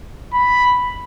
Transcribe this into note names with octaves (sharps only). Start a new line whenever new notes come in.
B5